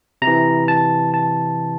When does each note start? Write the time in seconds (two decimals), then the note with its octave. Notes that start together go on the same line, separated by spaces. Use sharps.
0.22 C3 A#5
0.27 E3
0.68 A5
1.14 A5